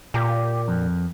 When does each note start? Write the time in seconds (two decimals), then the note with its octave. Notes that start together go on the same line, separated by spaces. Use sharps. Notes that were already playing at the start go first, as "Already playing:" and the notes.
0.14 A#2 G4
0.68 F2